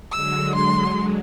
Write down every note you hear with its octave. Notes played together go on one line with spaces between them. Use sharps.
D3 F#3 G#3 E6
C6